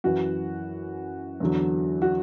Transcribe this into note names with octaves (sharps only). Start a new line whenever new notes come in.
F#2 E3 F#4
E2 D3 F#3
F#4